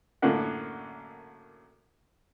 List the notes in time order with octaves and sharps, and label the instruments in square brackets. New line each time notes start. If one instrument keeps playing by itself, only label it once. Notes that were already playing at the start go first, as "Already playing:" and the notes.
[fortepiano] F#2 A2 D3 A#3 F#5